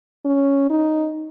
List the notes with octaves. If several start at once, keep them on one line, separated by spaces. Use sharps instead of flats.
C#4
D#4